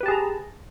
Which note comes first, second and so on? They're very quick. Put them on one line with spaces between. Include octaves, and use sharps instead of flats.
B4 G4 A5 G#4 A#5